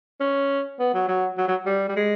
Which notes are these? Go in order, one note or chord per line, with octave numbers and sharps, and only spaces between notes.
C#4
B3
F#3
F#3
F#3
F#3
G3
G3
G#3